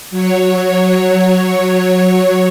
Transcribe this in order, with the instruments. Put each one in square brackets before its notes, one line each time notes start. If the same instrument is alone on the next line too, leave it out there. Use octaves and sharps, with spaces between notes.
[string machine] F#3 C#5